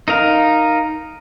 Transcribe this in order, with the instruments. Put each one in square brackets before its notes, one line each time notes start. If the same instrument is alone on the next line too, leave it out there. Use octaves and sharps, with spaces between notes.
[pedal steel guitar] D#4 A#4 F5